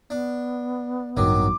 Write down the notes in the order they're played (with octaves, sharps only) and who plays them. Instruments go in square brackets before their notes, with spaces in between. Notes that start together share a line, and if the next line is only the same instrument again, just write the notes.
[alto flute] B3 [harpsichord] D4
[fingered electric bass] A1 G2 [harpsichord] D#3 F#3 [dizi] D6